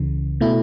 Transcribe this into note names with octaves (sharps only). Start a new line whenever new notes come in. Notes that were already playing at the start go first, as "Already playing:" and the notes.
Already playing: C#2 C#3 E3
B2 A3 E4